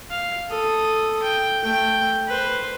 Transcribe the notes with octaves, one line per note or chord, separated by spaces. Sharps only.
F5
A4 D#6
G5
A3 G5
B4 C5